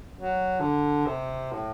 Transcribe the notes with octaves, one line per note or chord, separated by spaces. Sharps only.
F#3
D3
C3
A2